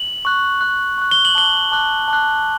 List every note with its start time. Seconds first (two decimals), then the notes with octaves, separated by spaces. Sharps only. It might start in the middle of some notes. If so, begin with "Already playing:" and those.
Already playing: F#7
0.25 C#6 F#6
0.61 C#6 F#6
0.98 C#6 F#6
1.11 G7
1.25 F#7
1.35 A5 D6 F#6 G7
1.72 A5 D6 F#6
2.08 A5 D6 F#6